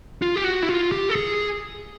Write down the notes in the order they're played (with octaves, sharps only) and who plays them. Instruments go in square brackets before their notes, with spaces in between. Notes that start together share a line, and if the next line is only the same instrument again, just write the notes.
[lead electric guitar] F4
G4
F#4
E4
F4
G4
A4
G#4